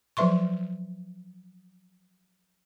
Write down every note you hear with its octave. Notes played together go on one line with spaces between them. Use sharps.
F3 F#3 B4 E5 C6 C#6